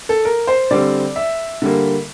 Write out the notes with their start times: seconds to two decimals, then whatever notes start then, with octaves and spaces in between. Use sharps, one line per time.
0.09 A4
0.25 A#4
0.47 C5
0.71 D3 G3 C4 D5
1.16 E5
1.62 D3 G3 A#3